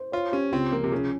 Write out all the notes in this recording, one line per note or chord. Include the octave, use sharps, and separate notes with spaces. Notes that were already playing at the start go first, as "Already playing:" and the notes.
Already playing: C5
F4 C#5
C#4 G4
C#2 C4
F3 A#3
C3
C#3 C#4